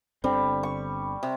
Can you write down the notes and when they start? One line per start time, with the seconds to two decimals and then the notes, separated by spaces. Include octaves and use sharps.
0.24 G1 D3 G3 C4
0.63 C#6
1.23 C3